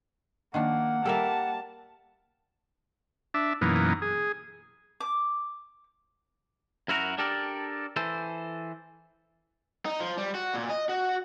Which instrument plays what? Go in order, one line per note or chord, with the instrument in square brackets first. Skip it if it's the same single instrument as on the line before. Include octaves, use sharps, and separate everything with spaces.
[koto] D#3 F3 D4 [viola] A#3 [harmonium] F#5
[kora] G3 A#3 A#4 [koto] A4 E5 [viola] A5
[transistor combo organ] D4 E5
F#2 B2 E3 A#3 D#4
G#4
[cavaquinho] D6
[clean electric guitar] F#2 E4 F#4 A#4
D4 G4 A4 A#4 D5
E3 A4 C5
[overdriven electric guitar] D#4
F3
G3
F#4
A#2
D#5
F#4